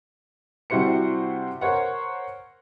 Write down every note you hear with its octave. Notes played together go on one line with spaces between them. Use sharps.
C3 G3 E4 F#4 C5 C#7
A#4 C5 C#5 F#5